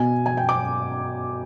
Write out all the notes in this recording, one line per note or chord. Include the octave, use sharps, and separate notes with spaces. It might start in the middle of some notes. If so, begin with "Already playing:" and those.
Already playing: B2 G#5
G#5
G5
D6